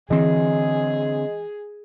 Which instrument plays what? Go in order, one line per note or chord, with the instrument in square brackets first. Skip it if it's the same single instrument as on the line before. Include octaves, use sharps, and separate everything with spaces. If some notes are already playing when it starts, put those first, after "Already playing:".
[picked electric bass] D3 C4 [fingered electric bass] E3 [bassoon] G#3 [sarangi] G#4